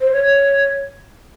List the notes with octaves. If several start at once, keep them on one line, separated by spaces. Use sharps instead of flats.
C5
C#5